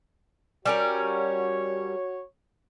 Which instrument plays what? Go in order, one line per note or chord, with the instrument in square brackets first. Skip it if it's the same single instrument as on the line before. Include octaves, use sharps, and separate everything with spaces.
[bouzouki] G3 C#4 A#4 [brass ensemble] F#4 C#5